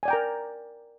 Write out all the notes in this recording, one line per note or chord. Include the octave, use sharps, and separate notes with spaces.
A#4 D5 G5 G#5 A#5